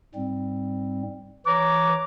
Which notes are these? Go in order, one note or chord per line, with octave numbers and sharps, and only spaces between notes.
G#2 G3 C4
E3 B4 C#5 A#5 D6